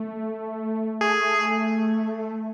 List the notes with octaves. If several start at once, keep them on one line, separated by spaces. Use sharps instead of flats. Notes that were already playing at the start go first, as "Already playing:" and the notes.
Already playing: A3
A3 G#4